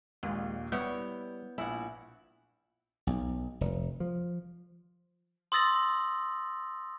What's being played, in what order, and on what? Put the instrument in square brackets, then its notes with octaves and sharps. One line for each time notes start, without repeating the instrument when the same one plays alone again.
[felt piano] A#1 D#2 A#2 [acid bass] G#3
[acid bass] G3 [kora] B3 E4 C#5 [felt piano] G6
[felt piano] A#1 G#5 [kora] E4 F#5
[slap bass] B1
F1
F3
[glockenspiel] C6 D#6 E6 A6 A#6 F#7